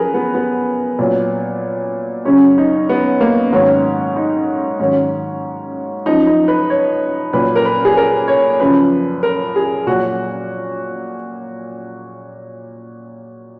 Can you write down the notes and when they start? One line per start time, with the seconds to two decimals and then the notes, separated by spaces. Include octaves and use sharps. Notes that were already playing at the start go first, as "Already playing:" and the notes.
Already playing: F#2 F3 G#4 A#4 B4
0.14 B3
0.35 B3
0.99 A#2 F#3
2.25 F#2 C#3 F#3 C#4
2.58 D#4
2.89 B3
3.21 A#3
3.52 G#2 D#3 F#3 C#4
4.16 D#4
4.79 G#2 D#3 F#3 C#4
6.06 F#2 F3 D#4
6.27 D#4
6.48 B4
6.70 C#5
7.33 A#2 F#3 B4
7.56 A#4
7.65 B4
7.85 G#4
7.97 A#4
8.28 C#5
8.60 F#2 C#3 F3 B4
9.23 A#4
9.56 G#4
9.87 A#2 F#3 F#4